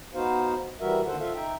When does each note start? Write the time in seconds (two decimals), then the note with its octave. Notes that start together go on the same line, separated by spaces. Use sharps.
0.14 B3 D#4 F#4 C5 F5
0.80 E3 G3 F#4 A#4 E5
1.06 D#2 D3 D#3 A4 C5 F#5
1.20 F4 A4 E5 F5
1.34 D#4 E5 G5